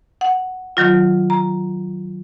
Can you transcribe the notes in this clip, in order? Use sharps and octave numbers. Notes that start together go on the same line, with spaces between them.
F#5
D#3 F#3 F4
A#5